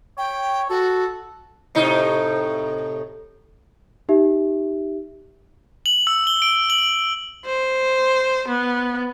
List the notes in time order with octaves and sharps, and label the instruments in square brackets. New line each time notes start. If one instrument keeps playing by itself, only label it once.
[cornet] C#5 [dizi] G5
[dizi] F#4 [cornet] A4
[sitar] A2 C3 D#4
[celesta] D#4 G4 E5
[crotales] F#7
E6
G7
D7
F#7
[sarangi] C5
B3